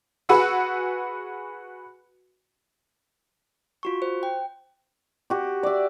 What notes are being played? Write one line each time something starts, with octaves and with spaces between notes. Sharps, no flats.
F#4 G#4 B4 F#5 B5 E6
F4 F#4 C#6
C5
G5
F#4 G4
D5 E5